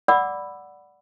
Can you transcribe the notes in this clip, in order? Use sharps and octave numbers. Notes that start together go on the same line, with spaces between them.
D5 F#5 B5 D6 E6